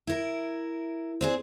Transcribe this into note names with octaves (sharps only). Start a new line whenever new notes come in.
E4 A#4
C4 D4 G#4